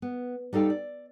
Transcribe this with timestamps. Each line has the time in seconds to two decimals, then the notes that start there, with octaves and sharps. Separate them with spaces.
0.02 B3
0.53 G3 D#4 A4 F5 G5
0.70 D5